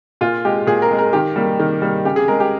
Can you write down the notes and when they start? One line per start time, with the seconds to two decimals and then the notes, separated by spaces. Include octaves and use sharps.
0.21 A#2 F4
0.45 G#3 G4
0.67 A#2 G#4
0.82 A#4
0.91 G#3
0.99 A#4
1.13 D#3 G4
1.36 G3 A#3
1.59 D#3
1.82 G3 A#3
2.05 C#3 G4
2.16 G#4
2.28 G#3 A#4
2.40 G4